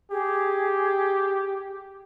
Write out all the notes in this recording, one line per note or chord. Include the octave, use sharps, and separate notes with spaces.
G4 G#4